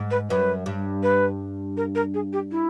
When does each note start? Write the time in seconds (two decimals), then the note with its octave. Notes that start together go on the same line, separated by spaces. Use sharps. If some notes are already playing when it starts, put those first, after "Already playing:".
Already playing: G#2
0.11 B4
0.30 F#2 B4
0.66 G2
1.03 B4
1.77 A#4
1.95 A#4
2.14 G#4
2.33 G4
2.51 E4